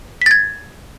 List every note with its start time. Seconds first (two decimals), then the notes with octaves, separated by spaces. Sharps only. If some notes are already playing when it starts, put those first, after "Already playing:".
0.22 B6
0.26 A6
0.31 G#6